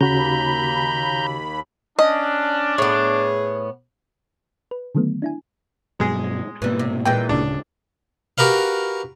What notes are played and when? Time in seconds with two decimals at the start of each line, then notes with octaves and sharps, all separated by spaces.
0.01 D#2 C#3 F#4 A#5 B5 G6
1.99 C#4 D4 D#5
2.78 A2 B3 G#4
4.71 B4
4.95 D3 D#3 F#3 A3 B3
5.22 D4 E4 G#5
6.00 G2 B2 F#3 G#3 G#4
6.62 G#2 B2 E3 G3 A#3
6.79 C3
7.05 A#2 E3 G#3 G5
7.29 D1 C#3 D4
8.38 F#4 G4 A#4 B4 F5